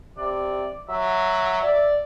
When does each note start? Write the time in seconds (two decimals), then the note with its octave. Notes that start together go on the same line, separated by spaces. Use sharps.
0.18 C3 D5
0.89 F#3 E5
1.62 D5